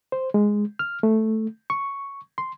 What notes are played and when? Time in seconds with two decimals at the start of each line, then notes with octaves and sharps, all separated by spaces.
0.12 C5
0.34 G#3
0.79 F6
1.03 A3
1.70 C#6
2.38 C6